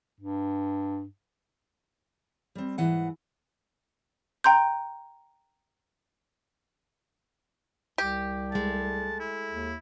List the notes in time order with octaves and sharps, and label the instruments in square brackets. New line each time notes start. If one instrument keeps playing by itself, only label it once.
[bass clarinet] G2
[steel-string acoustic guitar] G3 C4
G#2 E3 F#5 G#5
[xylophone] G5 A#5 C6 G6
[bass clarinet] C2 [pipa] G4
[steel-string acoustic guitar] G#3 A3 [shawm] A5
[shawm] E4
[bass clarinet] D#2